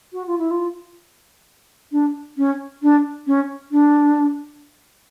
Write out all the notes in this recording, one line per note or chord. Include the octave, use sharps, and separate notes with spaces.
F#4
F4
E4
F4
D4
C#4
D4
C#4
D4